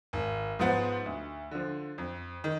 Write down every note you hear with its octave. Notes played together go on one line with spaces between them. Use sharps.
G#1
G#2 F3 B3
D2
D3 F3
F2
D#3